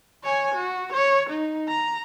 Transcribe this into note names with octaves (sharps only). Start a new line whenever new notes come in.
C#5 G#5
F#4
C#5
D#4
A#5